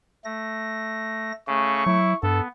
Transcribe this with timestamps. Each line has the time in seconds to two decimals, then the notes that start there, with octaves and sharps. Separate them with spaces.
0.25 A3 A#6
1.48 C#3 A3 C#6
1.86 F#3 E4
2.23 G2 B3 A4